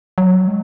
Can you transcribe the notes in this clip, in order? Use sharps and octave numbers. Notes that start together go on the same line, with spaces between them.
F#3
G#3